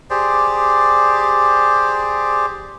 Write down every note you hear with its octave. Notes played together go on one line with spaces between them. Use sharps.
G4 G#4 C5 D5